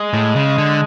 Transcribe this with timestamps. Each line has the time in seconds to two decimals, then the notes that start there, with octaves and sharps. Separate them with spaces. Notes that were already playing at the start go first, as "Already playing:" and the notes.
Already playing: G#3
0.14 A2
0.36 C#3
0.58 D3